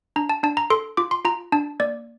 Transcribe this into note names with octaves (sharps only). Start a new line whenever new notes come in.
D4 A#5
A5
D4 A5
A#5
A4 C6
F4 D6
C6
F4 A#5
D4 A5
A#3 D5